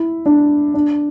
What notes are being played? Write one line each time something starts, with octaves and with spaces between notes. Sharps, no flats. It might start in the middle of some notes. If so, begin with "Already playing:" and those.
Already playing: E4
D4
D4